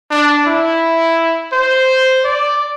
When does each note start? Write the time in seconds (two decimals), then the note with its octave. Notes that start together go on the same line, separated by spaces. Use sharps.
0.11 D4
0.47 E4
1.53 C5
2.24 D5